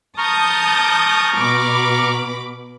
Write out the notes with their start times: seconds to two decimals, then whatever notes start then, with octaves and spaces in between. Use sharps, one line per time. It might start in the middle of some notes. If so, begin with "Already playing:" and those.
0.18 A5 A#5 C#6 D#6 F6 G6
1.37 B2 B5 D6